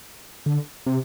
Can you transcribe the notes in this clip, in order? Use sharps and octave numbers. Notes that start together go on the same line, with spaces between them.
D3
C3